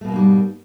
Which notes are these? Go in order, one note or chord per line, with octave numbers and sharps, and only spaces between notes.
G#2 B2 G3 A3 A#3